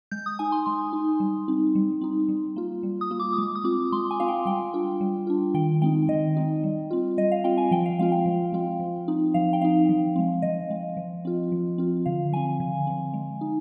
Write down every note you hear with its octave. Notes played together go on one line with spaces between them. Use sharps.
G#3 G6
D#6
D#4 G#5
C6
G#3 C6
D#4
G3
C4 D#4
G3
C4 D#4
G3
A#3 F4
G3
D#6
A#3 F4
D6
D#6
G#3 D6
D#6
C4 F4 D6
G#3 C6
G#5
C4 F4 F5
G5
G3 G5
D4 F4
G3
D4 F4
D#3 G5
G#3 C4 D#4 G5
D#3 D#5
G#3 C4 D#4
G3
C4 F4
G3 D#5
F5
C4 F4 G5
G#5
F3 G5
F5
G#3 C4 F4 F5
G5
F3
G#3 C4 F4
F3
C4 D#4
F3 F5
G5
C4 D#4 F5
F3
G#3 C4
F3 D#5
G#3 C4
F3
C4 F4
F3
C4 F4
D3 F5
F3 C4 G#5
D3
F3 C4
G#3
D#4